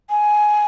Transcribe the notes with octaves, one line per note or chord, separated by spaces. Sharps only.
G#5